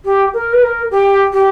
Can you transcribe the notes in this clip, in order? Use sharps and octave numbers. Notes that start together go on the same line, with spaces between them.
G4
A#4
B4
A#4
G4
G4